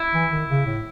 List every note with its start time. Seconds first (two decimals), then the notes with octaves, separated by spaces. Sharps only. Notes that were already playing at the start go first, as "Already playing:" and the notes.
Already playing: E4
0.13 E3
0.31 D#3
0.49 C#3
0.66 A2